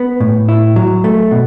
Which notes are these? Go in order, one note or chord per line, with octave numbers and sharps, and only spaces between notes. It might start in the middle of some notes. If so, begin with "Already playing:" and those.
Already playing: B3
A2
E4
F#3
A3
B2